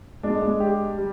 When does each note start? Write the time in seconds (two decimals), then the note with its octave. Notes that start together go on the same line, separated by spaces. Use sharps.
0.23 G#3 D4
0.42 G#3
0.60 G4
0.98 G3